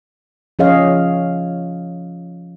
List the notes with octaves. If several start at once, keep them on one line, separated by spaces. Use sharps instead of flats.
F3 C#4 G#4 C#5 D#5 F5